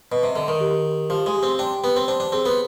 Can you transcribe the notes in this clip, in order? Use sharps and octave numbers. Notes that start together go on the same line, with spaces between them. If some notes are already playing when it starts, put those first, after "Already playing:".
B2 D#5
C3
D3 D#5
D#3
G4
G4
F3 G4
G#3
G4
C4
D4 G5
B3 G4
C4
D4 C5
D4
C4 G#4
B3